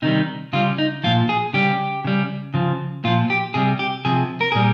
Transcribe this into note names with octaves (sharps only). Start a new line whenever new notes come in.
C3 D#3 G3 D#4
C#3 G3 F4
D#4
A#2 F3 F4
G#4
C#3 G3 G4
C#3 G3
C#3 F3
A#2 F3 F4
G4
C3 G3 G#4
G4
C3 F3 G#4
A#4
A#2 G3 G#4